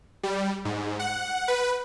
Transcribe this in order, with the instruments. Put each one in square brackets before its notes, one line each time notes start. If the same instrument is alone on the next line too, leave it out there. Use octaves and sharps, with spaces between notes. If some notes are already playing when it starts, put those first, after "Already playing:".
[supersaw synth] G3
G#2
F#5
B4